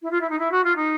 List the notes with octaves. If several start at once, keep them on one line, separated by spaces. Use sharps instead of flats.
E4
F4
E4
D#4
E4
F#4
F4
D#4